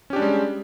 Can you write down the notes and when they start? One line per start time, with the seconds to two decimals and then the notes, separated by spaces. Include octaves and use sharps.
0.10 C#4
0.13 G4
0.16 D4
0.19 G3
0.22 G#3